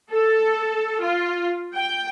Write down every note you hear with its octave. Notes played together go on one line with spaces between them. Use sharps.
A4
F4
G5